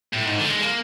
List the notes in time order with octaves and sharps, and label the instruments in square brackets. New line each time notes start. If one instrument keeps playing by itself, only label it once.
[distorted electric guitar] A2
G#2
D3
G3
G#3
A#3